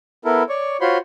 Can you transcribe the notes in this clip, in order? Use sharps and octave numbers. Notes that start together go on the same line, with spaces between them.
B3 E4 A4 A#4
C#5 D5 C#6
F4 F#4 C5 C#5 B5 C6